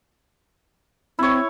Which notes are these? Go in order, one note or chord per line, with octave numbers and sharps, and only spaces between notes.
C4 E4 C#5